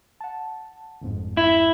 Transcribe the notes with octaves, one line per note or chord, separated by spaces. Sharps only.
F#5 A5
G1 F2 G#2
E4